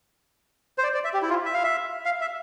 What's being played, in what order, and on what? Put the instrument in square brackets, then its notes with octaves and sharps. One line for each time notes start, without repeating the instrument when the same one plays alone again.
[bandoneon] C5
D5
D5
E5
G4
E4
F4
E5
F5
E5
F5
E5